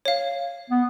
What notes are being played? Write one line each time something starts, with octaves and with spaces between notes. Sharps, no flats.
C#5 F5
B3